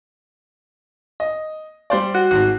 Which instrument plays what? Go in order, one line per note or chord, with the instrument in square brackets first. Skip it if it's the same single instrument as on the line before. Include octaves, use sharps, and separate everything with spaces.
[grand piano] D#5
G3 C5 D5
[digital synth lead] F#4
[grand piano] G#1 G#2 [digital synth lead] F#4